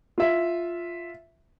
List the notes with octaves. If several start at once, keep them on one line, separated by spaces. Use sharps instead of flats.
F4 E5